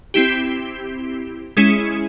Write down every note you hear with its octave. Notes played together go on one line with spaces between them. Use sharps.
C4 E4 G4
G#3 C#4 E4 G#4